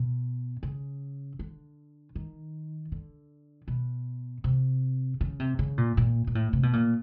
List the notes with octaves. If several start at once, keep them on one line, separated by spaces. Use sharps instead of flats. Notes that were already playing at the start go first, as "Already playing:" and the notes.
Already playing: B2
C#3
D3
D#3
D3
B2
C3
C#3
C3
C#3
A#2
A#2
A#2
A2
C3
B2
A#2